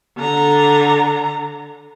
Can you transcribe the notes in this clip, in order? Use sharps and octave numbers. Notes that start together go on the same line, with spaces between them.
D3 A#5